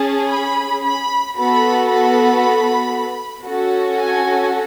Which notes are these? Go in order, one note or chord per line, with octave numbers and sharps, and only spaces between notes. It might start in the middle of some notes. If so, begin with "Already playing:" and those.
Already playing: C#4 G#4 A5
B5
B5
B3 F#4 A4 B5
B5
C#4 F#4 A4
G#5